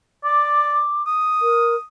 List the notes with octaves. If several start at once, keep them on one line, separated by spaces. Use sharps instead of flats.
D5 D6
D#6
A#4